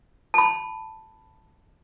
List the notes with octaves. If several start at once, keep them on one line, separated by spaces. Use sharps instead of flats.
A5 B5